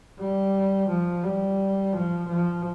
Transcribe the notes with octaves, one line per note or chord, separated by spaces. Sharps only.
G3
F3
G3
F3
F3